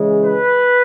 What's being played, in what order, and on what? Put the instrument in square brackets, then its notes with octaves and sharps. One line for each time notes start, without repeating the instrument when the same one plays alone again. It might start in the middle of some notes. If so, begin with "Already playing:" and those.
Already playing: [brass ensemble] C#3 E3 G#3
B4